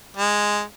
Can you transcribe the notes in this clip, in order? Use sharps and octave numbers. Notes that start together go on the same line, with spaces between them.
G#3